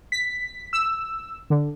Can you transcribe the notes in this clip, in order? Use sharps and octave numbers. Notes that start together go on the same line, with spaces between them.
B6
E6
D3